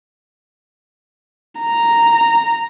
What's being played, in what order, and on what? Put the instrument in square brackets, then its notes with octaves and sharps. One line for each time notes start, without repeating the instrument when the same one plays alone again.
[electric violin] A#5